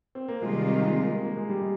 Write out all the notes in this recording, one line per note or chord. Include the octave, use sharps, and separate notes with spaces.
C4
A#3
C3 D#3 G3 G#3 C4 F4
A#3
G#3
A#3
A#3
G#3
G3
G#3